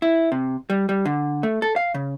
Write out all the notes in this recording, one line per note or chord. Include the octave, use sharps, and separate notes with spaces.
E4
C3
G3
G3
D3
A3
A4
F5
C#3